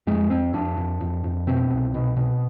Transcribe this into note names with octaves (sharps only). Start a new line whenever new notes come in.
F2 G#3
F2 C4
F2 D4
F2
F2
F2
B2 C4
C2
B2
B2